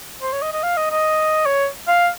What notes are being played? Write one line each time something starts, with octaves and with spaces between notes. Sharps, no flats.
C5
C#5
D#5
D#5
F5
D#5
D#5
C#5
F5